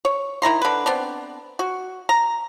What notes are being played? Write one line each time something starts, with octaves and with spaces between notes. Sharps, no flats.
C#5
D#3 E4 A#5 C6
D3 B4
B3 C4 D4
F#4
A#5